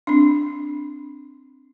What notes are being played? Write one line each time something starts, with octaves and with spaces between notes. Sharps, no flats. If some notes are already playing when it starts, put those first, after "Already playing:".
C4 D4